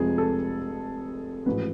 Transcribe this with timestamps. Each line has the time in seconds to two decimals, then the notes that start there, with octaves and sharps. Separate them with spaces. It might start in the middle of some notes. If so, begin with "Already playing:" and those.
Already playing: F1 F2 F3 G#3 G#4
0.18 A4
1.46 A1 G#2 F3 B4